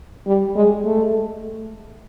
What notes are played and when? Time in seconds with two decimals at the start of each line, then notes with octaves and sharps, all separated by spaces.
0.27 G3
0.56 G#3
0.85 A3